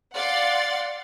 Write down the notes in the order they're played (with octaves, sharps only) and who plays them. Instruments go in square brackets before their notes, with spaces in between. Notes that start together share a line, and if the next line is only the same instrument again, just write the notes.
[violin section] D5 F5 F#5 C6 A6